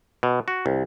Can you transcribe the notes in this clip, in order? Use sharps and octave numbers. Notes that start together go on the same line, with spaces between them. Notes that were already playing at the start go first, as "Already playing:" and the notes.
B2
F#4
C2